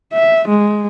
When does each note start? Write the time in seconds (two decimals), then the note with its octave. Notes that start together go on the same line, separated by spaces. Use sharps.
0.13 E5
0.48 G#3